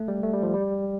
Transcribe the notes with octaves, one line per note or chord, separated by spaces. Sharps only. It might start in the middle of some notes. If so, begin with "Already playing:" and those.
Already playing: A3
G3
A3
G3
F3
G3